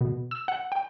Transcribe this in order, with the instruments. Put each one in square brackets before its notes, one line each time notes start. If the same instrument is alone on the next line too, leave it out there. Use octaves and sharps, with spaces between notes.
[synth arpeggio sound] B2
E6
F#5
G5